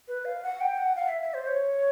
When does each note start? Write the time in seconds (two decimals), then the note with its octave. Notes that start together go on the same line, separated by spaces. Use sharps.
0.08 B4
0.25 F5
0.43 F#5
0.61 G5
0.78 F#5
0.96 F5
1.08 E5
1.22 E5
1.34 C5
1.47 C#5